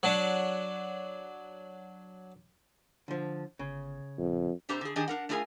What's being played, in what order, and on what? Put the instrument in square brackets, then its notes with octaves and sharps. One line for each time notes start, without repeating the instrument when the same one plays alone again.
[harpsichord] F#3 D4
[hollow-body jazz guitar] D3 F3
[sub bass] G1 [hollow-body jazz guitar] C#3
[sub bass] D#1 [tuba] F2
[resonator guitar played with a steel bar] C3 D4 G4 A4 C5 A#5
D3 G#4
D#3 D4 G4 G#4 D#5
D4 A#4 F#5
A3 D4 F4 G#4 A#4 G#5